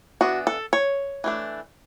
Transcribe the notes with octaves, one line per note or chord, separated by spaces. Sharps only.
E3 B3 D4 F#4
A4
C#5
E3 A3 D4